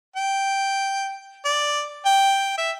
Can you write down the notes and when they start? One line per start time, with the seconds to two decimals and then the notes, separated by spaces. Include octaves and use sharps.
0.16 G5
1.45 D5
2.05 G5
2.58 E5